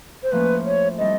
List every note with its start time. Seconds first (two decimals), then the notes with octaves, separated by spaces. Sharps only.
0.23 C5
0.32 A2 F3 A#3 C#4 B4
0.65 C#5
0.98 G3 C4 E4 A4 D#5